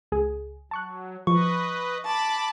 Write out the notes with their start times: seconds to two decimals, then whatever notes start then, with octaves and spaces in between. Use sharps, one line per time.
0.12 C#2 G#4
0.71 F#3 A5 C#6 F#6
1.27 F3 B4 D#5 C#6
2.05 A5 B5 D6